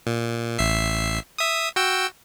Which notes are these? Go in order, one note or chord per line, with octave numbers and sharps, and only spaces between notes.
A#2
A1 E5 C7
E5 D#6
F#4 G5 E6